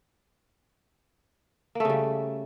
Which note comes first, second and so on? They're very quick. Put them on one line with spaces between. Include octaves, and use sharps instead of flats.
A#3 A3 C#3 G3